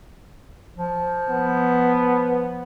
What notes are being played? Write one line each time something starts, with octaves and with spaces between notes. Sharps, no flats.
F3
B3